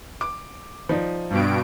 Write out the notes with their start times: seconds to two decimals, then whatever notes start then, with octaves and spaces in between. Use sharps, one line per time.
0.21 D6
0.89 F3 D#4 D5
1.30 G2 B2 D7